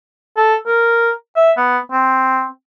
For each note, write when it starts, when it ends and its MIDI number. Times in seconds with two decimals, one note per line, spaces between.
0.37 0.55 69
0.67 1.10 70
1.36 1.52 76
1.57 1.78 59
1.91 2.46 60